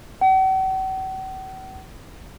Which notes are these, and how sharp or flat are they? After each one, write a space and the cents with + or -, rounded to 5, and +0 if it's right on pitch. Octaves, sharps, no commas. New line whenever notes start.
F#5 +45